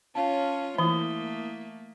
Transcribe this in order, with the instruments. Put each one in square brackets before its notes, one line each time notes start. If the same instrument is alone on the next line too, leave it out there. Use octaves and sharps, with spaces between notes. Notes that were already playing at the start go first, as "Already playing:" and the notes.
[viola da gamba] C#4 F4 [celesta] C#5 F5 A5
[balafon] E3 [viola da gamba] A3 A#3 [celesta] E4 D#6 G7